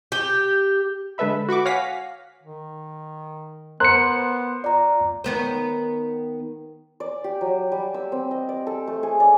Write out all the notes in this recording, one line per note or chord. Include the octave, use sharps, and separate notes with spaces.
G4
D3 G#3 A4 B4 E5 B5
F#4 B5 C#6 D6
C#5 F5 F#5 G#5 A#6 B6
D#3
B3 A#4 C5 C6 F#6 C#7
F4 D5 A#5
D#3 B3 C5
D5
G4
F#3
G3
E6
C4
D#5
D5
A4
A3
G#4
D5